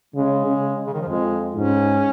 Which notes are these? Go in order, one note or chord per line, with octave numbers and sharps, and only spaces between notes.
C#3 G#3
C#3
C#3
D#3
F3
F2 G#3
G#2 C#4